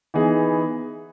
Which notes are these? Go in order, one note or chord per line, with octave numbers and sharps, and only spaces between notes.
E3 B3 D#4 G#4